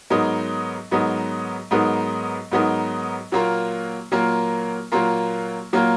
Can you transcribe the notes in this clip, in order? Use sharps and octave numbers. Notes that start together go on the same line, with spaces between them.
G#2 F#3 B3 D#4 A#4
G#2 F#3 B3 D#4 A#4
G#2 F#3 B3 D#4 A#4
G#2 F#3 B3 D#4 A#4
A#2 F#3 A#3 F4 A#4
A#2 F#3 A#3 F4 A#4
A#2 F#3 A#3 F4 A#4
A#2 F#3 A#3 F4 A#4